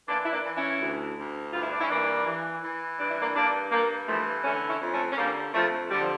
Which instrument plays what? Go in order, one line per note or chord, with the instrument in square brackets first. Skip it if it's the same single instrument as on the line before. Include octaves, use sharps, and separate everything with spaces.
[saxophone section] E3 A#3 D4
E4
A#3 D4
E3
C#4 E4
D2
D2
G2 F4
E4
D4
C#4 E4
E3 A#3 D4
E3
E3
G2 D4
E4
A#3 D4
G2 A#3 D4
G2 G3 A#3
E3 F3 A3
D3 A3 C#4
C#4 E4
F2
A3 C#4
C#4
D3 G3 A#3
F2 F3 A3
D3 G3
F3